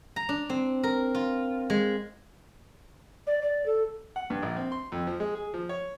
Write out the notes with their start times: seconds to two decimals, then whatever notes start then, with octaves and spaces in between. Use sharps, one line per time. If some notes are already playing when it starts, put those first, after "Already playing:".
0.16 A#5
0.29 D4
0.50 C4
0.83 A#4
1.15 F4
1.70 G#3
3.27 D5
3.42 D5
3.66 A4
4.16 F#5
4.30 G2
4.43 A#1
4.56 C4
4.72 C6
4.92 F2
5.07 F3
5.20 G#3
5.35 G#4
5.54 F3
5.69 C#5